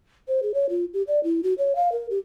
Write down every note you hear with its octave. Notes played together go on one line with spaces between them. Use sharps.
C5
G#4
C#5
F4
G4
D5
E4
F#4
C#5
F5
A#4
G4